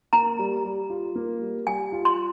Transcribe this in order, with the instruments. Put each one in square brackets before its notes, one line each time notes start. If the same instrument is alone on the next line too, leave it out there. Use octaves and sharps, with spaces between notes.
[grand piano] A#3 [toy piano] A#5
[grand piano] G3
G3
F4
A#3
G3
[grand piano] G3 [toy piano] G#5
[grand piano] F4
[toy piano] C6